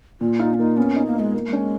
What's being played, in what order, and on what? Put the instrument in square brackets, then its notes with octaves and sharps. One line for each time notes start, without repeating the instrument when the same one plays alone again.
[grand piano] A#2 [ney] F4
[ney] D#4 [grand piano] F4
[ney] C#4
[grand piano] A#3 [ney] D#4
[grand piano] B3 [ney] C#4
[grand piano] D#4
[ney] A#3
[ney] G#3 [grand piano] D#4
[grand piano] A#3
[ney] G#3
[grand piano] C#4